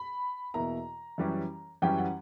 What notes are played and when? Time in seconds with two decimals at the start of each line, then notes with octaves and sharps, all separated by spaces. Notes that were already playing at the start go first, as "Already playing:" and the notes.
Already playing: B5
0.54 E2 B2 A#3 E4 A#5
1.18 F#2 E3 G3 C#4 G4
1.82 F#2 E3 G3 C#4 G4 G5
1.98 F#5